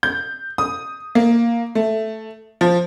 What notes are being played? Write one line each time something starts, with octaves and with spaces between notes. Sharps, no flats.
G6
D#6
A#3
A3
F3